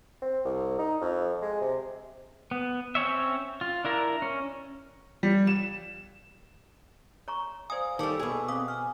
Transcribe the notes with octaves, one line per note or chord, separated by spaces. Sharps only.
C4
C2
D#4
F2
G#3
C3
B3
C4 C#4 C#5 E5
F4
D4 E4 A#4 A#5
C#4
G3
E7
C#5 A#5 C#6
C5 D5 F5 G#5 D#6
D#3 G3 A4 A5 C#6 D6
B2 G#4
C4 C5 F5 D6 D#6
G#5 F6